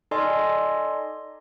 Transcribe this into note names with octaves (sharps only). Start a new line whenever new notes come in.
D#4 A4 D5 D#5 G#5 C6